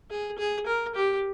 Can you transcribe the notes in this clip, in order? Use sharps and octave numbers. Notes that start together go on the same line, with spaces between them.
G#4
G#4
A#4
G4